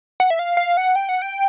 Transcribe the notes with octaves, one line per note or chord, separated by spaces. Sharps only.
F#5
E5
F5
F5
F#5
G5
F#5
G5